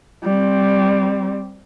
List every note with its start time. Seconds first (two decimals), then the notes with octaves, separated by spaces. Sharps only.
0.24 G3 C4